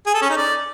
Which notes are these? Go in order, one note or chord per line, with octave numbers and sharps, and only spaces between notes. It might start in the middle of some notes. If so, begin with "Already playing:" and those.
G#4
A4
C#4
D#4
D5